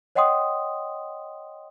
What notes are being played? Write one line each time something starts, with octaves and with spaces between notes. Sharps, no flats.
C#5 D#5 F#5 G5 C6 D#6